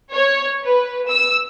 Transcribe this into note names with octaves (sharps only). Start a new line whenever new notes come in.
C#5
B4
E6